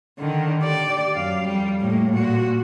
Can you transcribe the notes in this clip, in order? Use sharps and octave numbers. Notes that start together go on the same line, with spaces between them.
D3 D#3
G4 D5
F#2 F5
F2 G3
A2 A#3
A#2 F#4